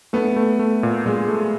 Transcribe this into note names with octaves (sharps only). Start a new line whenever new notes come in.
A3 B3
A3
A3
A#2
A#2 G#3
A3